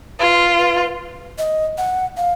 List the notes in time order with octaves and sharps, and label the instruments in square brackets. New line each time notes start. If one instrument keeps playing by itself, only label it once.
[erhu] F4 [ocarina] B4
[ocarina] B4
D#5
F#5
F5